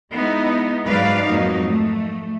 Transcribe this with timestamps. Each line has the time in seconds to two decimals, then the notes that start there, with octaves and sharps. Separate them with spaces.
0.12 G#3 B3 D#4 E4
0.87 G#2 F#3 G#3 B4 D5 F5
1.27 F2 G#2 F#3 A#3 D#4
1.66 A3